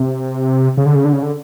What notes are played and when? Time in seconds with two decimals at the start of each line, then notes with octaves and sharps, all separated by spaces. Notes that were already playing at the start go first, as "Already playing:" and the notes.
Already playing: C3
0.78 C#3
0.86 D3
0.95 C#3
1.05 D3
1.13 C#3
1.22 D3